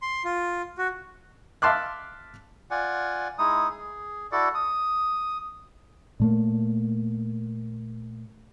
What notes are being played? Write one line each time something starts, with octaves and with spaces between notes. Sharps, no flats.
C6
F4
F#4
E5 F5 A5 C6 D6 F#6
F4 D5 F#5 G#5
G#3 D#4 E4 D#6
G#4
E4 F#4 A4 D5
D#6
A#2 A3 A#3